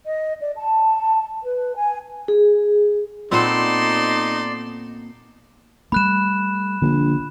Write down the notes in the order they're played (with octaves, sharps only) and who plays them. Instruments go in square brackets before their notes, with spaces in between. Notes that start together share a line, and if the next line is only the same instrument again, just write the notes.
[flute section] D#5
D5
A5
B4
G#5
[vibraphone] G#4
[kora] A#2 B3 C4 [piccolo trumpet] D#4 [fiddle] A4 C6 [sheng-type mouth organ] D5
[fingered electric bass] G3 A3 [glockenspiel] B5 F#6 E7
[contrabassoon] A#1 [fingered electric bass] D3 C4 D4